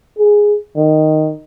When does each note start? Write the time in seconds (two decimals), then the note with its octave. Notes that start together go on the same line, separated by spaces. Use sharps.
0.18 G#4
0.77 D#3